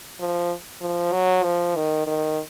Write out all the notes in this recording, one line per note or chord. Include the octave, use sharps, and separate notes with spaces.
F3
F3
F#3
F3
D#3
D#3